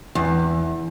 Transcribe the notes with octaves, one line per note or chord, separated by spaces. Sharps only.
E2